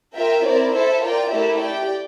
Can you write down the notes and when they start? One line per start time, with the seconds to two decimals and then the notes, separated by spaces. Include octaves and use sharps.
0.17 F4 A#4 E5 G5
0.46 C4 E4 A#4 D5
0.74 E4 A4 C5 E5
1.04 F4 A#4 D5 G5
1.32 A3 E4 G4 A#4 E5
1.60 G4 D5 G5